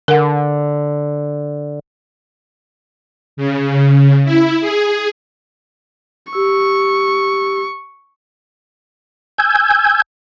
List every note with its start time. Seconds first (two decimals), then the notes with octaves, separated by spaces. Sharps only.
0.08 D3 A#4 F#5
3.37 C#3
4.25 E4
4.61 G#4
6.33 G4 C#6 E6
9.38 G#5 E6 G6 G#6